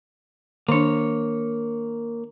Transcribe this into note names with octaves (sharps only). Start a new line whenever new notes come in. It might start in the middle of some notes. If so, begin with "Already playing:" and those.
D#3 A#3 D4 C#5